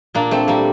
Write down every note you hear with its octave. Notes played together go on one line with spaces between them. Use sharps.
A#2 A#3 D4
A3 C4
G3 A#3